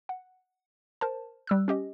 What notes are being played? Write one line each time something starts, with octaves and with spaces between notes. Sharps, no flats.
F#5
A#4 C5 A5
G3 E6 F#6
C#4 G4 D#5